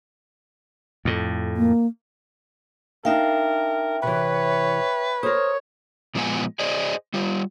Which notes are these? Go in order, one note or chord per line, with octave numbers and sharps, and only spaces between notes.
F2 A2
A#3
D4 D#4 A#4 E5 F5 G5
C3 E3 B4 C#5
A#4 C5 C#5 D#6
A#2 F3 G#3 B3 F#5 G#5
G#4 C5 D5 D#5 G#5
G3 F4